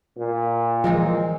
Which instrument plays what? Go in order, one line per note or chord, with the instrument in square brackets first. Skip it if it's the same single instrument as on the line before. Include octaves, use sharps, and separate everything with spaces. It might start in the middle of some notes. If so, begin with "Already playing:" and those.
[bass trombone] A#2
[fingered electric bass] E3 F3 [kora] G#3 C4 D#4